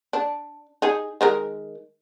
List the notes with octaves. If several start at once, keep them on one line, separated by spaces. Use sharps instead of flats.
D4
D#4 G#4
D#3 G#3 A#4